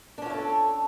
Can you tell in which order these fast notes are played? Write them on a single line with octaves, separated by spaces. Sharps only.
D4 C#4 F#4 E4 A4